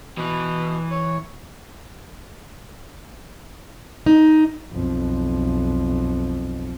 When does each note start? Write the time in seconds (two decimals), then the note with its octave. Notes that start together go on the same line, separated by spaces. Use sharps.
0.17 B2 E3 B4
0.91 C#5
4.06 D#4
4.72 B1 F2